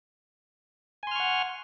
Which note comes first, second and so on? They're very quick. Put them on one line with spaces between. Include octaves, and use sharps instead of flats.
G#5 C6 F6 C#6 F#5